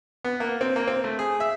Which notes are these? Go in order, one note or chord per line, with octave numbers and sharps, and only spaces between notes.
B3
A#3
C4
A#3
C4
A3
G#4
E5